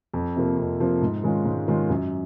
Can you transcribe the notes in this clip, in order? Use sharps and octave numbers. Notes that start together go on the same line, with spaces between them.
F2
C3 F3 A#3
F2
C3 F3 A#3
G#2
D#3 G#3 C#4 F4
G#2
D#3 G#3 C#4 F4
F#2